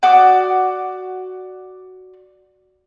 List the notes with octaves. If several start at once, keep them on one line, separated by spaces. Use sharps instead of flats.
F#4 D5 D6 D#6